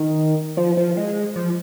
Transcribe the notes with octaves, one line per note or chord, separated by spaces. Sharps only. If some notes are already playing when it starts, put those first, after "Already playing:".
Already playing: D#3
F3
F3
G#3
F3